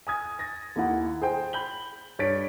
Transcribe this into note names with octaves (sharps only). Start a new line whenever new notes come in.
G#5 D#6 G#6
D#6 A6 A#6
D#2 A#3 E4 F#5
G#4 C5 G5
B5 G6 F#7 G7
G2 C#5 A6 B6 D7